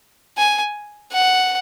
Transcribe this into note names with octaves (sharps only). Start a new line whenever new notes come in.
G#5
F#5